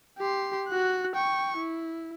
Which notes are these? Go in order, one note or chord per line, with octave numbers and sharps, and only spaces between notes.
G4 C6
F#4 F#6
G5 C#6
E4